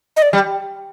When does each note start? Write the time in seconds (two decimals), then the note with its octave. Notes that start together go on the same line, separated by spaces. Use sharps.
0.17 D#5
0.22 D5
0.33 G3